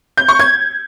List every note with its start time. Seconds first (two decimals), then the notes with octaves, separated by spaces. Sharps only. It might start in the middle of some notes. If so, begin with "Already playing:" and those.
0.17 G6
0.28 C#6
0.39 G#6